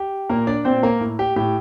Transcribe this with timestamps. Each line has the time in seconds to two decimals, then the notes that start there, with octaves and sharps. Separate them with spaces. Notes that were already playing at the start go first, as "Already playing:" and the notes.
Already playing: G4
0.29 A#2 A#3 A#4
0.47 D4 D5
0.65 A#2 C4 C5
0.83 A#3 A#4
1.01 A2
1.19 G4
1.36 A2 G4